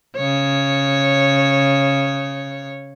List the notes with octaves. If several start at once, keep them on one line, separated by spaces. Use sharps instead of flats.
C#3 C#5